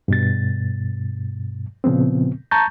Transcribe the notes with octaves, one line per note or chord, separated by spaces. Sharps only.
G2 B2 A6
A#2 C#3 F3 B3 C4
A5 A#5 C#6 G6 A6